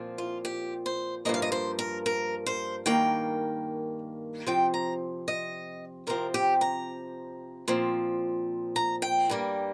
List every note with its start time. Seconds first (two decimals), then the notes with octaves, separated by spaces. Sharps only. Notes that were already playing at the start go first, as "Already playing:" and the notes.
Already playing: A#2 F3 C4
0.18 F4
0.45 G4
0.86 C5
1.25 G2 F3 A#3 D#5
1.34 F5
1.42 D#5
1.52 C5
1.79 A#4
2.06 A#4
2.46 C5
2.86 G2 D#3 A#3 G5
4.47 C3 F3 C4 G5
4.74 A#5
5.28 D#5
6.07 C3 F3 C4 A#4
6.34 G4
6.61 A#5
7.68 A#2 F3 C4
8.76 A#5
9.02 G5
9.29 G2 G3 A#3